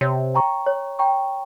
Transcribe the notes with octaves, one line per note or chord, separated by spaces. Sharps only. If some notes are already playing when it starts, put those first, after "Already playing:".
C3 C#5
G5 A#5 C#6
C#5
G5 A#5 C#6